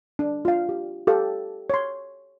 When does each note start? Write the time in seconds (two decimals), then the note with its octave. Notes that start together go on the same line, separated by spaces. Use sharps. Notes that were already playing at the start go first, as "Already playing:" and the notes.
0.19 D4
0.45 F4 F5
0.69 G4
1.07 G4 A4 F5
1.70 C#5 C6